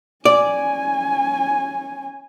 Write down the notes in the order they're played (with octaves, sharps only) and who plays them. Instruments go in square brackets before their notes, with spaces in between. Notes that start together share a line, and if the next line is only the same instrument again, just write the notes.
[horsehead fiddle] C#4 G#5 [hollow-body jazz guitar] D5